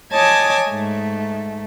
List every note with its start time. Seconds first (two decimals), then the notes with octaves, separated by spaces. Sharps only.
0.12 C#5 D#5 G#5 A5 D6 D#6
0.68 G#2 A3